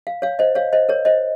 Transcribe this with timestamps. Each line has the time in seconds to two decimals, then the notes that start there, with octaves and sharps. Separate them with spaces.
0.07 F5
0.22 C#5 F5
0.39 C5 D#5
0.55 C#5 F5
0.73 C5 D#5
0.89 A#4 C#5
1.05 C5 D#5